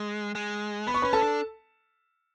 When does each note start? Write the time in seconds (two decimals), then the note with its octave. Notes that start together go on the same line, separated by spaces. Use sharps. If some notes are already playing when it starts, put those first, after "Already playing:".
Already playing: G#3
0.35 G#3
0.87 B3 B5
0.94 C#6
1.02 C#4 B4 B5
1.13 A4 A5
1.23 D4